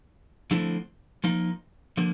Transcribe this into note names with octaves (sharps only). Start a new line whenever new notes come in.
D3 F3 A3 C4 E4
F3 A#3 D#4
D3 F3 A#3